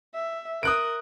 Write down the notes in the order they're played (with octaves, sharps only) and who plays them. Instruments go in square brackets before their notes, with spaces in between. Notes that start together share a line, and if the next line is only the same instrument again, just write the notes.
[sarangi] E5
[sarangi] A#4 [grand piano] D#6 F#6 D7